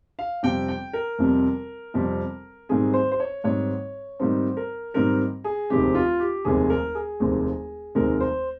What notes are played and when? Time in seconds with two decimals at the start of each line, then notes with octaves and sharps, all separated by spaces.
0.19 F5
0.43 F2 C3 G3 C4 G5
0.68 G5
0.93 A#4
1.18 F2 C3 G3 C4
1.94 F2 C3 G3 C4
2.69 G#2 D#3 G3 C4 G#4
2.94 C5
3.12 C5
3.20 C#5
3.44 G#2 D#3 G3 C4 C#5
4.19 G#2 D#3 G3 C4 C5
4.57 A#4
4.94 G#2 D#3 G3 C4 A#4
5.44 G#4
5.70 F1 D#2 D#3 G#3 C4 G4
5.95 F4
6.19 G4
6.45 F1 D#2 D#3 G#3 C4 G#4
6.70 A#4
6.95 G#4
7.20 F1 D#2 D#3 G#3 C4
7.95 F1 D#2 D#3 G#3 C4 A#4
8.20 C5